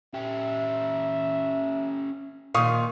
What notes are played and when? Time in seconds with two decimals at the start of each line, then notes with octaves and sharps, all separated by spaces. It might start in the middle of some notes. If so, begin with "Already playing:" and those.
0.14 C#4 G4 E5
2.54 A#2 D#3 F5 C#6 D#6